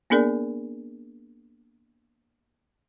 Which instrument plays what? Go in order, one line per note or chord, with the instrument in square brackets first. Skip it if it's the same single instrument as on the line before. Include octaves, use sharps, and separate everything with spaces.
[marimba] A#3 B3 D4 G#4 A#4 D5